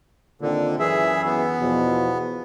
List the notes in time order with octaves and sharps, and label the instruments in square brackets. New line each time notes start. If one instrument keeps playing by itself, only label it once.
[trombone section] A#2 D#3 C4 [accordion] D3
[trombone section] F#2 E3 [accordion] G#4 E5
[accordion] B3
[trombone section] E2 B2 F3